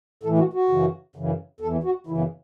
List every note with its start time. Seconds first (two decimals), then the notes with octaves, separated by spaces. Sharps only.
0.23 A2 E3 A4
0.38 F#4
0.53 F#4
0.69 F#2 C#3 E3
1.16 F#2 C#3 E3
1.60 E2 E3 A4
1.84 F#4
2.07 F#2 C#3 E3 E4
2.18 B3